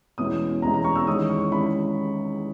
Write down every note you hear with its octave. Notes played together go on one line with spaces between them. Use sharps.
E2 B2 G#3 C#4 E4 D#6
E2 B2 G#3 C#4 E4 A#5
A#5
C#6
E6
E2 D#3 G#3 C#4 E4 D#6
C#6
D#3 G#3 C#4 E4 B5